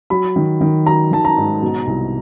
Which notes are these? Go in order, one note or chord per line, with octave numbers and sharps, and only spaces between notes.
F#3 B5
D#3
D#3
F#3 A#5
D#3 A5
A#5
G#2
B2
C2